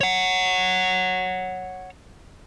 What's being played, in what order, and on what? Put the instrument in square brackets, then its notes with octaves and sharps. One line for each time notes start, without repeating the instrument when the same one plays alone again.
[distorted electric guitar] C#5 F#5